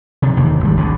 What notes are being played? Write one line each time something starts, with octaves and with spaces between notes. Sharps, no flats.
C3 D#3
E1 D#2 D#3 A#3
G#1 G3
G#1 B2 D3